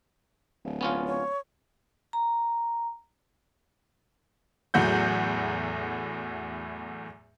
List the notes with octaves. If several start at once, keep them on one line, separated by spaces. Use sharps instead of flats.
D1
B3 C#4 F4
C#5
A#5
E2 A2 F#3 F#5 G6